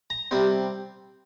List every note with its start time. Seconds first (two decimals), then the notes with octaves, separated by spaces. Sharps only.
0.10 A#5
0.31 C3 G3 C4